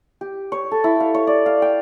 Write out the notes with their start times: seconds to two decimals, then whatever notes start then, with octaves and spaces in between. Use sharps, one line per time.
0.21 G4
0.52 C#5
0.71 A4
0.84 E4
1.00 F5
1.14 C#5
1.27 D5
1.46 F5
1.62 G5